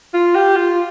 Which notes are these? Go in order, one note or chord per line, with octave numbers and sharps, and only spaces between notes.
F4
G4
F4